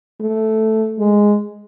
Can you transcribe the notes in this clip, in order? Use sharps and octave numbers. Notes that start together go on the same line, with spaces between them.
A3
G#3